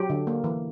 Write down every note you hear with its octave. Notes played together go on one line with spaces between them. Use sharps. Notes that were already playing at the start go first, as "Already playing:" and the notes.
Already playing: F#3 G4
D3
A#3
E3